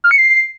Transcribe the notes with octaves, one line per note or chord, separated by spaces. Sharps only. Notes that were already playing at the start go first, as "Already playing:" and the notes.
F6
C#7
C7